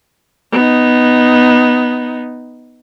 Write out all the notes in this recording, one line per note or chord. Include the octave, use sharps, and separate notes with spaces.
B3 D#4